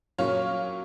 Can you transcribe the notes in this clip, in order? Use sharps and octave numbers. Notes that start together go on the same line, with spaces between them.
A#2 F#3 A#3 C#4 C#5 F5